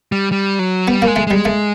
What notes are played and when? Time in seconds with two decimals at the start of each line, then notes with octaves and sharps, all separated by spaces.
0.12 G3
0.32 G3
0.59 F#3
0.88 G3 B3
1.02 G#3 A#3
1.16 A3
1.27 G3 G#3
1.45 A3